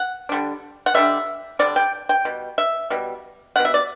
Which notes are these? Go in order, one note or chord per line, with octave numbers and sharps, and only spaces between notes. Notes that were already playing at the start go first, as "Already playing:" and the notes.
Already playing: F#5
D3 G3 D4
F#5
D3 G3 D4 E5
D3 G3 D4 D5
G5
G5
B2 G3
E5
B2 G3
B2 G3 B3 F#5
E5
D5